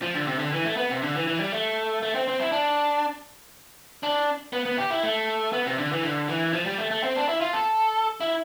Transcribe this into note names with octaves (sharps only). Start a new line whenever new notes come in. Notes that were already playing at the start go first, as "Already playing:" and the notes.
F3
D3
C3
D3
E3
A3
B3
C3
D3
E3
E3
G3
A3
A3
C4
C4
E4
D4
D4
B3
B3
G4
E4
A3
B3
C3
D3
E3
D3
E3
F3
G3
A3
A3
C4
D4
E4
F4
A4
E4